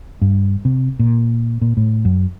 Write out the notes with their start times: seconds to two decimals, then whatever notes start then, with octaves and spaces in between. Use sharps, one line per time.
0.21 G2
0.65 C3
0.99 A#2
1.62 A#2
1.77 A2
2.05 F#2